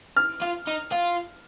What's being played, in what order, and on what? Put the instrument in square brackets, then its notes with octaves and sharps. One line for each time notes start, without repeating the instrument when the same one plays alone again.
[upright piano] F6
[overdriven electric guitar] F4
D#4
F4